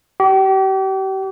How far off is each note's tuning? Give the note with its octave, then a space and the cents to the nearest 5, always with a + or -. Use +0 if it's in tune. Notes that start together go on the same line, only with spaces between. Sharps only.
G4 -35